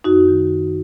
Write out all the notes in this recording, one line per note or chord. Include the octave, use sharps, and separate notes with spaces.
F#2 D#4 F#4
D#3
F#2